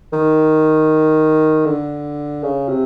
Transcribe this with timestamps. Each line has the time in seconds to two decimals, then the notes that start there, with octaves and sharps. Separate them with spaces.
0.13 D#3
1.65 D3
2.43 C#3
2.68 C3